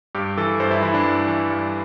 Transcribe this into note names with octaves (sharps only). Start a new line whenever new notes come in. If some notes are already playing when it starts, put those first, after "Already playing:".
G2 G4
E3 A4
G2 C5
E4
E3 E4
D4
G2
E3
G2